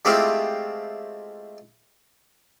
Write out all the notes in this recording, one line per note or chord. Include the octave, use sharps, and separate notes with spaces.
G#3 A3 C4 E4 F4 G4